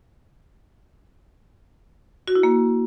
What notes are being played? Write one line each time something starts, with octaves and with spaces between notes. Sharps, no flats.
F#4
E4
A#3